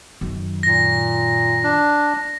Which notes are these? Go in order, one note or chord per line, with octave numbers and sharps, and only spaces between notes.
F#2 D#3
A#2 A#6
D4